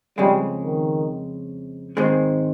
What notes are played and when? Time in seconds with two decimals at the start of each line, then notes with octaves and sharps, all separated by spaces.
0.18 F2 C#3 G3 G#3
0.63 D#3
1.97 G#2 D#3 G#3 C4